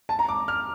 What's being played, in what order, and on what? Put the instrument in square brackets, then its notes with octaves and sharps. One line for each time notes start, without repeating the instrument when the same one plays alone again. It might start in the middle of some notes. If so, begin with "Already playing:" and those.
[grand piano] A5
A#5
D6
F6